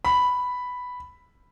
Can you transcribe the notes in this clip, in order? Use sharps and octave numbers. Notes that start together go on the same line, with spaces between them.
B5